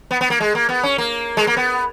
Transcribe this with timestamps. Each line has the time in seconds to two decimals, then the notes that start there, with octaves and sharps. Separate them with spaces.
0.11 B3
0.21 B3
0.30 A#3
0.40 G#3
0.55 A#3
0.69 B3
0.83 C#4
0.98 A#3
1.37 G#3
1.47 A#3
1.57 B3